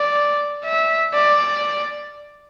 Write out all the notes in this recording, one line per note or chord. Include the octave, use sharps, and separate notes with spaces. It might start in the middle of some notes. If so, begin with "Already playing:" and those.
Already playing: D5
E5
D5